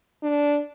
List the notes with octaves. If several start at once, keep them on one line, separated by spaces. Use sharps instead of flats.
D4